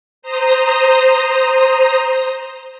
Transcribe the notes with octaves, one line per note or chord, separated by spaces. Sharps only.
C5 A#5 D#6